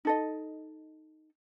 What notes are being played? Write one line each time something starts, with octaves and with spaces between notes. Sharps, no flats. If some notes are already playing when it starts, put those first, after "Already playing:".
D#4 A4 D#5